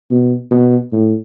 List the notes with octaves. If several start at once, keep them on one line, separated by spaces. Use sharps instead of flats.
B2
B2
A2